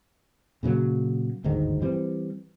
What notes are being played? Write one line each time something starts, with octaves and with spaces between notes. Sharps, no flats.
A#2 C#3 F#3 A#3
G1 D2 G#2 D#3
E3 G3 C4